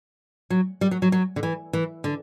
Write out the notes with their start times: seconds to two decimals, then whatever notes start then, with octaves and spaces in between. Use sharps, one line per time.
0.50 F#3
0.81 G3
0.91 F#3
1.02 F#3
1.12 F#3
1.36 D3
1.43 E3
1.73 E3
2.04 D3